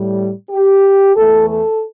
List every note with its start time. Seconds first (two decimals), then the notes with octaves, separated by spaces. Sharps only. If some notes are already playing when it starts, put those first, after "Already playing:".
Already playing: A2 G3
0.50 G4
1.15 E2 E3 A3 A4
1.48 A4